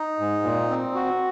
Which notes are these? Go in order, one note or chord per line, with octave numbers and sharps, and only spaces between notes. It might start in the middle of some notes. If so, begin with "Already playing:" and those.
Already playing: D#4
G#2
A#2
C4
F#4